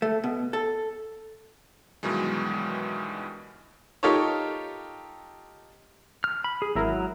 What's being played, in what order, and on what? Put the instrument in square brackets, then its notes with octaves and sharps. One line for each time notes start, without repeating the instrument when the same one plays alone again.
[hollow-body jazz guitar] A3
B2
A4
[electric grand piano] G2 B2 D#3 E3 F#3 G#3
[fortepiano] D#4 F4 G4 A4 A#4 C#5
[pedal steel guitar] F6
B5
G#4
[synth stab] G#1 E4 A#4 [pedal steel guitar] F#3